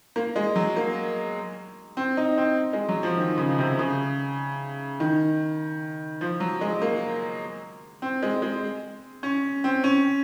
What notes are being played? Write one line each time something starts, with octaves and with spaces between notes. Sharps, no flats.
A#3
G#3
F#3
A#3
C4
D#4
C4
G#3
F#3
F3
D#3
C#3
C3
C#3
D#3
F3
F#3
G#3
A#3
C4
G#3
G#3
C#4
C4
C#4